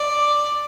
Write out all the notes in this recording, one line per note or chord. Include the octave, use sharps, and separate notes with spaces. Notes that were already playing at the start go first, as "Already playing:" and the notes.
Already playing: D5